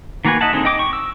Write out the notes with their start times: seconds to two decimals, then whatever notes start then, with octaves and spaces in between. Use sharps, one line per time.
0.25 D#3 A#3 F#4 B4 G#5
0.41 D#5 E5 F#5 A5
0.52 D3 G#3 C4 D#4
0.65 D#5 G5 D6
0.79 C#6
0.93 E6